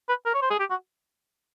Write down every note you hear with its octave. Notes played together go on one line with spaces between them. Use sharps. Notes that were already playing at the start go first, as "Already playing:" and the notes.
B4
A#4
C#5
C5
G#4
G4
F#4